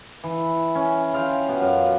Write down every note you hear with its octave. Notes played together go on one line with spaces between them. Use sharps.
E3
C#4
F4 F5 G5
B2
F#2 F5